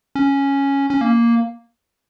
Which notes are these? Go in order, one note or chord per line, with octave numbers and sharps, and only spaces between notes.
C#4
C#4
A#3